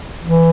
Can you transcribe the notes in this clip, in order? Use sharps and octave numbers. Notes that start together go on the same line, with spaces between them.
E3